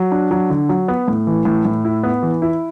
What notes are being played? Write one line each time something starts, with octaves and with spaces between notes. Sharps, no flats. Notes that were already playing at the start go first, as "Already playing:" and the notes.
Already playing: F#3
D4
F#3
D3
F#3
B3
A2
E3
A2
A2
E4
B3
E3
E4